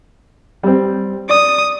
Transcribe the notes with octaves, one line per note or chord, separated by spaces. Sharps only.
G3 C4
D5 D#6